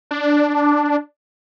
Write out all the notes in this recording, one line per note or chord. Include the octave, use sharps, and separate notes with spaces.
D4